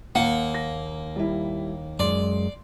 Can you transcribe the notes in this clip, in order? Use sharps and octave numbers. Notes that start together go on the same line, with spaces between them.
D#2 A#3 F#5
A#6
G3 E4
F#2 G#3 D5 C6